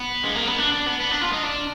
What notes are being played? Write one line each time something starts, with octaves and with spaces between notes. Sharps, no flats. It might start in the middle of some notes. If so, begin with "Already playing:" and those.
Already playing: B3
G#3
A#3
B3
D4
D4
B3
B3
D4
F4
D#4
D4